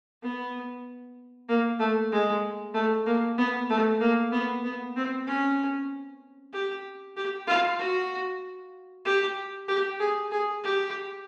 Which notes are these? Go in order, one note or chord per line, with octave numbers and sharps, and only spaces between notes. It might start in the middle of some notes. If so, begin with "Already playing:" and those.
B3
A#3
A3
G#3
A3
A#3
B3
A3
A#3
B3
B3
C4
C#4
G4
G4
F4
F#4
G4
G4
G#4
G#4
G4